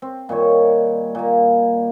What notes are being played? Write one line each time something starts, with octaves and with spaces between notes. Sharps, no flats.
C4
A#2 D#3 G3 C#5
A#2 A#3